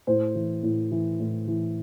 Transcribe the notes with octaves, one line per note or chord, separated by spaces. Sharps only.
A2 C5
E3
A2
E3
A2
E3